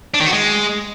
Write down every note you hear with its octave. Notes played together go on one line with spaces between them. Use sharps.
D4
D#3
F#4
G#3